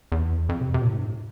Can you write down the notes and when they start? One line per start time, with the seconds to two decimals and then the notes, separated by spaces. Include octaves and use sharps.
0.12 E2
0.49 F2
0.61 C3
0.74 C3
0.81 A#2
0.87 A2
0.96 G2
1.05 A2